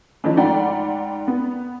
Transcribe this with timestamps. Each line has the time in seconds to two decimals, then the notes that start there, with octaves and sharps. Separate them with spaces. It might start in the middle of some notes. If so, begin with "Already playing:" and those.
0.24 E3 F3 A3 C#4 D#4
0.37 G#2 D5 F#5 G5 B5
1.28 B3